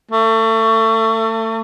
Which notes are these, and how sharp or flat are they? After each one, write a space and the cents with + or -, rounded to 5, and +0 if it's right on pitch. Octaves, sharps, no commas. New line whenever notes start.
A3 +30